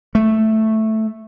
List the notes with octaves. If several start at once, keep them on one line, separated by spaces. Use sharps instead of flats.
A3